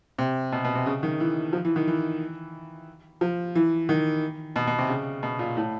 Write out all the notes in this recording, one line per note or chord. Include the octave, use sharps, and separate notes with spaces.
C3
B2
B2
C3
C#3
D#3
E3
F3
E3
D#3
E3
F3
E3
D#3
B2
B2
C3
C#3
B2
A#2
A2